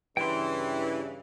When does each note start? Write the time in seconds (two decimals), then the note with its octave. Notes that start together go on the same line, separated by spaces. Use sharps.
0.17 G2 C#3 E3 G5 C6